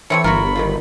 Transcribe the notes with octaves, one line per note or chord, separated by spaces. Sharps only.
E3 A3 C4 C#5 C#7
G1 F4 F#4 A#4 C#5 B5
D#3 F#3 F4